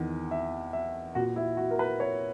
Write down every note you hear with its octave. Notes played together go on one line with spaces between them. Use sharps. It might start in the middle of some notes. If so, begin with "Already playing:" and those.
Already playing: E2 D#3
E5
E5
A#2 F#4
E4
F#4
A#4
B4
C#5